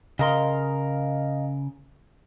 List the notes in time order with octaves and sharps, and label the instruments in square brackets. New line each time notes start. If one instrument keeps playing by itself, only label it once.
[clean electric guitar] C#3 A#4 C6 [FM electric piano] D#5 F5 A#5